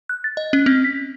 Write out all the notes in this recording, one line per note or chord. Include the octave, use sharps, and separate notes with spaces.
F#6
A6
D#5
C#4
C4
B6